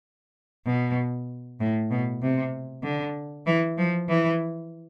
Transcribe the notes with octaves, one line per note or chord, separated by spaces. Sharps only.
B2
A2
B2
C3
D3
E3
F3
E3